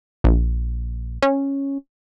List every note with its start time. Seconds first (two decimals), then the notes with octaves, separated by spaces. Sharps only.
0.24 A#1
1.22 C#4